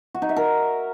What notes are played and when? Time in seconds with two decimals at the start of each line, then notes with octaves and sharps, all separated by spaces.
0.15 F#4
0.22 D#4
0.29 E5
0.37 A#4